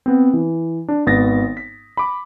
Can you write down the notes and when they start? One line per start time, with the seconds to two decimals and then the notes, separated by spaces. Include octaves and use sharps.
0.06 B3 C4
0.33 E3
0.88 D4
1.06 G#1 B3 D#6 A6 A#6
1.57 B6
1.97 B5 D6